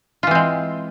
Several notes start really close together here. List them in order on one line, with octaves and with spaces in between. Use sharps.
F4 E3 C4 G#3